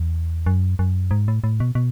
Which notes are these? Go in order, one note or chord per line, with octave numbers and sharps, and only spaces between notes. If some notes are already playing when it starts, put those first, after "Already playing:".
Already playing: E2
F#2
F#2
G#2
A2
A2
B2
B2